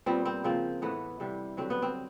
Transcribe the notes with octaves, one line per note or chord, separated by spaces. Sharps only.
A#2 G3 B3 C4
C4
C#3 F3 A#3 C4
A2 E3 A3 B3
C3 E3 G3
G2 D3 F#3 C4
B3
C4